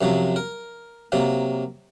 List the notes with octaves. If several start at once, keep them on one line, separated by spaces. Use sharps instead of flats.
F#2 C3 F3 F#3
A#4
C3 F#3 A#3